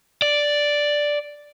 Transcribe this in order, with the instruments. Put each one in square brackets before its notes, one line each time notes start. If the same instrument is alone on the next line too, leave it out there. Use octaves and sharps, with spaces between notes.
[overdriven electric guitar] D5